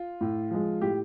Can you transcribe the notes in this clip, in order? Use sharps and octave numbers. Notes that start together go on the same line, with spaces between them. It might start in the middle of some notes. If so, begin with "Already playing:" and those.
Already playing: F4
A2
F3 G#3
A2 G4